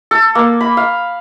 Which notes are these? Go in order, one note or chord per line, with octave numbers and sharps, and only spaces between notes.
A4
A#3
B5
F5